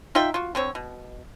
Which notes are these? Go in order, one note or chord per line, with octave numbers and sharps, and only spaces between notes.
D#4 F4 E5 G5
F4 F#4
D3 C4 C#5
B2